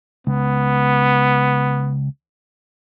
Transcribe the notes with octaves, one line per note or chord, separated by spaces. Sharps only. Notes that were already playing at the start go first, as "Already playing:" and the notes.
C#2 B3